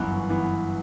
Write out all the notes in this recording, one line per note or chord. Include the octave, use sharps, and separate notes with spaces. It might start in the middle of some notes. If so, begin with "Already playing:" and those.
Already playing: G1 F#2 E3 B3 F#6
E3 B3